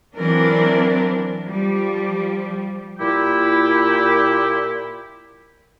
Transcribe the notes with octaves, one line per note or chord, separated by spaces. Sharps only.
E3 F#3 C4 D4 A#4
F3 G3
A#2 E4 G4